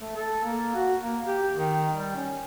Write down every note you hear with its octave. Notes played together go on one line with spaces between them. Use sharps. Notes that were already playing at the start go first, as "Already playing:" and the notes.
A3
A4
A#3
F#4
A#3
G4
D#3
G3
C#4